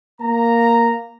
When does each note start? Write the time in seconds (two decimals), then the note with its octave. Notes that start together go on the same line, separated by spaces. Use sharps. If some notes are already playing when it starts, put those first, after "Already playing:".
0.21 A#3 A#5